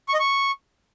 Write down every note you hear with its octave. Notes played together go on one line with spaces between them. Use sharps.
C#6
D#5
C#6